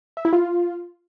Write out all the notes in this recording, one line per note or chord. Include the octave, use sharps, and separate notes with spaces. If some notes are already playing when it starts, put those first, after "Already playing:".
E5
E4
F4